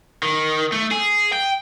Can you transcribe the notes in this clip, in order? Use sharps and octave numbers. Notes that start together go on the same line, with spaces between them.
D#3
A3
G#4
G5